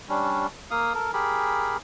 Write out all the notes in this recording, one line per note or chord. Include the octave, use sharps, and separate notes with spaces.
G3 C#4 D4
A#3 F5 D#6
A4 A#4
G4 G#4 A#4 B5